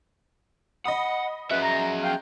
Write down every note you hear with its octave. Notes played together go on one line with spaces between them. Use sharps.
D#5 F#5 B5 D#6
C#4 F#4 G#4 B4 E5
A#5
F5 G5